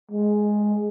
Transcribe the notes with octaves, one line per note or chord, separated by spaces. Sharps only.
G#3